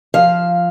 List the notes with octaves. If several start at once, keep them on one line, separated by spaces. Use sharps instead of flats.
F3 F5